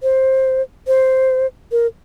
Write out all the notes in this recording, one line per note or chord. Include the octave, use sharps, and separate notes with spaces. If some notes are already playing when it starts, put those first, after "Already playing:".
C5
C5
A#4